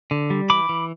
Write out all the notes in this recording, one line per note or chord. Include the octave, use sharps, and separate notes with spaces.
D3
G3
E3 B5 D6
E3